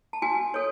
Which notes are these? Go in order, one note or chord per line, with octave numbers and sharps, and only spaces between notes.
A5
F#4 G#5
A4 C#5